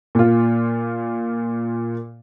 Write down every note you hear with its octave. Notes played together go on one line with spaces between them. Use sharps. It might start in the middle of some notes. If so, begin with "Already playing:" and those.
A#2 F4